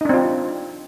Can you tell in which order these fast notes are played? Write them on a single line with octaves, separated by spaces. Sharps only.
D#4 D4 C4 F4